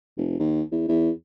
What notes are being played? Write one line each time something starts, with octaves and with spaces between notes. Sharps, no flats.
F1
D#2
E2
E2